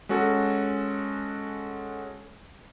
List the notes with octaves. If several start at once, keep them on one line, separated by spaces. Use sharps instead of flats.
G#3 C#4 F#4 A4